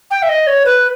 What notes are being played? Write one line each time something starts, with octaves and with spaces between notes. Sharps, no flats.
G5
E5
D#5
C#5
B4